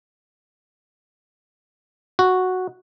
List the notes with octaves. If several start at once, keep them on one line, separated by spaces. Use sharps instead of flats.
F#4